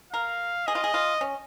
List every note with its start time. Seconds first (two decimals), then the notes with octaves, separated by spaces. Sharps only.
0.13 A#4 F5
0.67 G#4 D#5
0.75 F4
0.84 G#4
0.94 F4
1.21 C#4